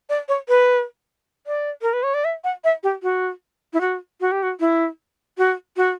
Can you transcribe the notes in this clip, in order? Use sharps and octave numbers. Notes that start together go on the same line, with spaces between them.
D5
C#5
B4
D5
A#4
B4
C#5
D5
E5
F#5
E5
G4
F#4
E4
F#4
F#4
G4
F#4
E4
F#4
F#4